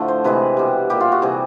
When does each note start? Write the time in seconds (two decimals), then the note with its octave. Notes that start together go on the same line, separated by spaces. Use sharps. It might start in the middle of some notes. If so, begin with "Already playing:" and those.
Already playing: A2 D3 F3 A3
0.08 C5
0.24 C3 E3 G#3 B4
0.57 B2 G3
0.90 A#2 G3 G4
1.01 F4
1.12 F#4
1.22 C3 E3 G3 G#4